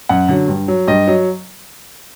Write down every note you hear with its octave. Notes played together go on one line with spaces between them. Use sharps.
F#2 F#5
D3 F#3
G2
F#3
G2 D#5
F#3